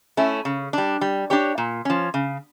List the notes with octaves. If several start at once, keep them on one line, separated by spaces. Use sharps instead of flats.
A3 C#4 E4
C#3
G3 D4
G3
D4 G4 C#5
A#2
F3 C#4
C#3